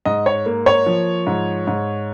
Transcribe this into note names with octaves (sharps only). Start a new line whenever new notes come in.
G#2 D#5
C#5
A#3
C#5
F3
G#2
G#2